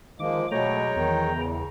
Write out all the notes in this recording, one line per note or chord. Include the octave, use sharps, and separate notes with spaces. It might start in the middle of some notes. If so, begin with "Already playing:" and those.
D#3 F3 G#3 A#3 D6
B2 F#3 G#3 A3 C#5 G5 A#5
E2 D#3
C#3